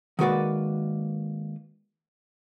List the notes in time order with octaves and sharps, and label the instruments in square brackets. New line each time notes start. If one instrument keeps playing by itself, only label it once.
[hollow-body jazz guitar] D#3 G#3 A#3 F#4 B4 D5